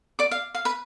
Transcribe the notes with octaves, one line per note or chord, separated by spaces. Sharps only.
D5 D6
F5
F5
B4 B5